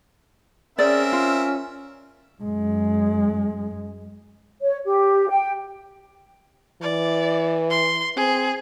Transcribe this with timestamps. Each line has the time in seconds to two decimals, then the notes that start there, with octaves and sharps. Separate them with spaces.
0.79 C4 C#4 G#4 A#4 D5 E5
1.13 F4
2.42 F#2 G#3
4.61 C#5
4.85 G4
5.29 G5
6.82 E3 D5
7.70 C6
8.17 C4 G#4